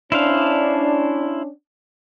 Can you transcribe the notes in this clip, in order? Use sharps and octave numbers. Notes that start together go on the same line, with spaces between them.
C#4 D4 E4 C5 F5